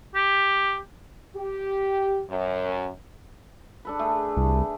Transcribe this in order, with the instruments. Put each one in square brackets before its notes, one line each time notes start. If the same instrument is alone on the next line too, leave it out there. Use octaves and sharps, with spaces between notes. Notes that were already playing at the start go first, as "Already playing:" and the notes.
[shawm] G4
[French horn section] G4
F#2
[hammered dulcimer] D4 A4 B4
A3 G#4
[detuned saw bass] C2